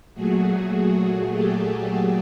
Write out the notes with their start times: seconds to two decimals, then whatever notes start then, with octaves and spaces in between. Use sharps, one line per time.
0.14 A#2 F#3 A3 F#4 G#4
0.93 F#4 G#4
1.32 G4 A4
1.71 G4 A4